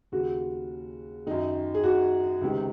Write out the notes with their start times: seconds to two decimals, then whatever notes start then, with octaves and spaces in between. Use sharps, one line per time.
0.12 D#2 C#3 F#4
1.27 F#2 D#3 D#4
1.74 G#4
1.84 F#4
2.42 C#2 C3 D#3